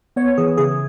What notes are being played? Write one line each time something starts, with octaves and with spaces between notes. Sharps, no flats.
B3 C#5
E3 G#4
C#3 G#4